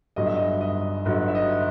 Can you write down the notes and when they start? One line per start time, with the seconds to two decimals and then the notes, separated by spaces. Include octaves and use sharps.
0.16 G1 G2 F#3 D#5
0.26 E5
0.36 D#5
0.61 D#5
1.05 G1 G2 F#3 D#5
1.28 E5
1.35 D#5